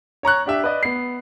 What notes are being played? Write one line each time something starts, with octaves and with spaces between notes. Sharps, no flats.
C#5 A#5 C#6 F#6
D4 G4 E5
B4 D5 D#5
B3 C7